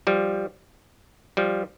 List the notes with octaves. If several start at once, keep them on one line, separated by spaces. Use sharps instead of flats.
F3 G3
F3 G3